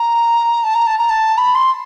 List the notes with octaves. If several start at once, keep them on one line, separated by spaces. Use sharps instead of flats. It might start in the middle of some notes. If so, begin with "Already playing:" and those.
Already playing: A#5
A5
A#5
A5
A#5
A5
B5
C6